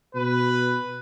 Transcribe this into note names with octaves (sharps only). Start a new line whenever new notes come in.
B2 B4